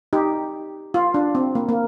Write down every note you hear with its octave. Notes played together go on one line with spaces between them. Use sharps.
D#4 G4
F4
D4
C4
A#3
A#3